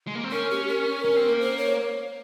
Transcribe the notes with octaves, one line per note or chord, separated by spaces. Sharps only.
G#3
A#3
C4
C#4 A#4
G4
A#4
C#4
C4
A#3
C5
C#5